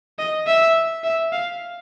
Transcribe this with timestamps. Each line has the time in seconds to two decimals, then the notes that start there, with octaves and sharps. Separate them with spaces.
0.19 D#5
0.47 E5
1.04 E5
1.32 F5